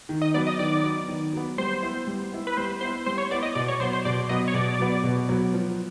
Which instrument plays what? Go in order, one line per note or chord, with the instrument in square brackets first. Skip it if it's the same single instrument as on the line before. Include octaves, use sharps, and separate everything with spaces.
[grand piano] D#3
[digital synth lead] D#5
[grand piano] F#3 B3 [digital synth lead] D5
[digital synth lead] D#5
[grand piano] D#3 [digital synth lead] D5
[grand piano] F#3 B3
D#3
F#3 B3
[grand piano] G3 [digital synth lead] C5
[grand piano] B3 E4
G3
B3 E4
[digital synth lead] B4
[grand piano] G3 [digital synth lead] C5
[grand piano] B3 E4 [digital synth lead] C5
[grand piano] G3 [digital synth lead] C5
[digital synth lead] C#5
[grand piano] B3 E4 [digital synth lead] D5
[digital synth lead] D#5
[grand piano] B2 [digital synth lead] D5
[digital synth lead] C#5
[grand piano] F#3 B3 [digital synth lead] C5
[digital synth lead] C5
[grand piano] B2 [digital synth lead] D5
[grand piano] F#3 B3 [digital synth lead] D#5
[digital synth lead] C#5
[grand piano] B2 [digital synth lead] D5
[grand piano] F#3 B3
B2
F#3 B3
F3